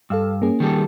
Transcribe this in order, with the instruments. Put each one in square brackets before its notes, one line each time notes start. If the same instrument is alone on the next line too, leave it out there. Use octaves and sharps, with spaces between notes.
[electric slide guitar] G2 [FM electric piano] A4 F5 E6
[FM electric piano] A#3 C#4 G#4
[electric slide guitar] D#3 G3 A4